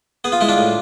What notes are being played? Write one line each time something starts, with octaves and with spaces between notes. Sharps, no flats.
B3 G#4
F4
G#3 E4
D4 F4
A2